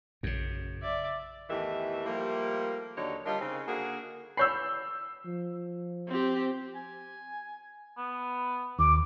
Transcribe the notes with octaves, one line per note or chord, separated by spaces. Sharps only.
A#1 F#2 C#3
D5 E5
E2 A2 D#3 E3 G4 E5
F3 G3 A3 A#3
D#2 D3 F#3 D#4 C#5 D5
G3 D4 D#4 F4 A#4 C#5
C#3 C4 D#4
D3 A#3 F#4 G#4
C#5 B5 E6 G6 C7
F3
C4 G4
G#5
B3
D#2 D6